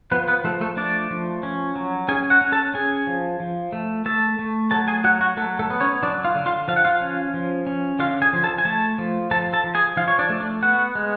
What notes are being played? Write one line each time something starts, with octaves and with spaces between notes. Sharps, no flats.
F3 B3 B4
B3 B4
F3 A3 A4
A3 A4
A3 D4 D5
F3
C#4
F#3
C#4 G#4 G#5
F#4 F#5
C#4
A4 A5
C#4 G#4 G#5
F3
F3
A3
A3 A4 A5
A3
F#3 A4 A5
G#4 G#5
F#3 F#4 F#5
F#4 F#5
F#3 A3 A4
A3 A4
B3
C#4 C#5
F#3 D4 D5
F4 F5
D3
F4 F5
F3 F5
F#5
F4 F5
C#4
F3
C#4
D3 F4 F5
G#4 G#5
F3
A4 A5
G#5
A3 A4 A5
F3
F3 A4 A5
A4 A5
F3
G#4 G#5
F3 F4 F5
C#5
D4 D5
A3
D4 D5
B3 F#4 F#5
G#3